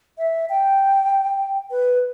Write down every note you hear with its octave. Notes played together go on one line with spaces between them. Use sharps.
E5
G5
B4